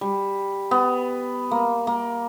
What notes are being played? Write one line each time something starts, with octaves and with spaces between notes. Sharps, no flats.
G3
B3
A#3
A#3